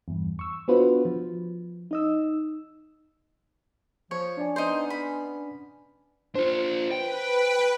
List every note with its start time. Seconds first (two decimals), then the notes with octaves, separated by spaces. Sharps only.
0.08 E2 G2
0.39 C#6 E6
0.68 B3 D4 F4 F#4 B4 C5
1.05 F3
1.91 D#4 D#5 E6
4.11 F3 C#5
4.37 D4 D5 G#5
4.56 B3 C#4 D#4 C5
4.90 B5
6.35 D4 F4 C5
6.91 B4 G5